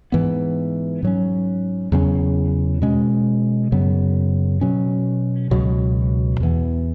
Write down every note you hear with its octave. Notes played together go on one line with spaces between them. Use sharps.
G#2 E3 B3
G#2 F#3 C#4
E2 C#3 F#3 C#4
B2 G#3 C#4
F#2 C#3 F#3 B3
B2 F#3 C#4
C#2 B2 F#3
E2 E3 B3